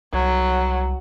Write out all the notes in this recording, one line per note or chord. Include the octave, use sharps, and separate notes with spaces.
C2 F#3